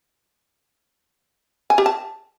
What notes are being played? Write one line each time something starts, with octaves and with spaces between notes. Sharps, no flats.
G#5
G4
A5